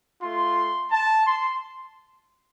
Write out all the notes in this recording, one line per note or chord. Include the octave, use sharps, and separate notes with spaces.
A3 F4 C6
A5
C6